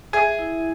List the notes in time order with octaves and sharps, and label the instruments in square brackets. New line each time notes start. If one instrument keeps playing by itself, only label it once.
[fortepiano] G#4 G#5 [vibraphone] E5
[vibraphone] E4